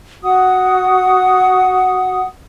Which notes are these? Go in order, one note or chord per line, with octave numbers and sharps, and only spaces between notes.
F#4 F#5 D#6